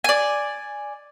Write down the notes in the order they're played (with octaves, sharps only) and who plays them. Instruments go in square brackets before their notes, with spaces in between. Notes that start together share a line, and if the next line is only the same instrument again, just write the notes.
[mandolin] D5 G#5